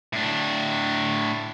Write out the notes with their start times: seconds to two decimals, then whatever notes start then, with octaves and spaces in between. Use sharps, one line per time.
0.13 A2 D4